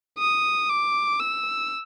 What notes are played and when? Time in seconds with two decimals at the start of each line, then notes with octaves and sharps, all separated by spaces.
0.19 D#6
0.69 D6
1.19 E6